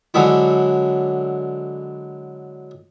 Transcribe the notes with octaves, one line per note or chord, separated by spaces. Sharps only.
D3 F#3 G#3 E4